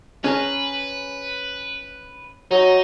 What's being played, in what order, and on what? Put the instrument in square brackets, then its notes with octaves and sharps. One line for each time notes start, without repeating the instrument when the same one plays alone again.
[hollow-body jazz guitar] C#4 G#4 A#4 [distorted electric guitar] B4
[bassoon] F#3 [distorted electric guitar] D#4